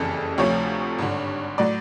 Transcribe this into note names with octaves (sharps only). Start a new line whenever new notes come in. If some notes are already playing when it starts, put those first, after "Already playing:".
Already playing: F#1 F2 C#3 E3 G3 A4
D2 C3 F3 A3 C#5
G#1 G2 D3
A2 F#3 D5